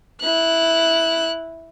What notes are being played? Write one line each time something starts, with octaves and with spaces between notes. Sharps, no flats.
E4 F#6